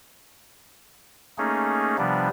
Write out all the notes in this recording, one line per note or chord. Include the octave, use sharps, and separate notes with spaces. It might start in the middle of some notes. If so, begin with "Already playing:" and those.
A3 A#3 C#4 D#4 G#4
C3 F3 G3 B3 D4